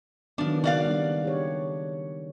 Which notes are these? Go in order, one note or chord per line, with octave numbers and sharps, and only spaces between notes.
D#3 F3 F#3 B3 D4
C#3 A#3 F#4 D5 F5
G3 B3 D4
G4 C#5